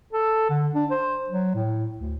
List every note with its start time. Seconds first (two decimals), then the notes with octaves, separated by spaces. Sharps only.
0.13 A4
0.49 D3
0.75 D4
0.91 C5
1.30 F#3
1.55 A2
1.98 D2